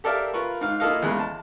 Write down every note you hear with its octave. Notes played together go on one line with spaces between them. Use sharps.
G4 A4 A#4 D5 E5 F5
F4 A#4 B4 C#6
G#2 F5
A#3 E4 F4 A4 D#5 F5
E2 C#3 G#3 F#6
A5